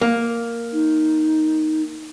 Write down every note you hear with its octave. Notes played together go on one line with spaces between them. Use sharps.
A#3
D#4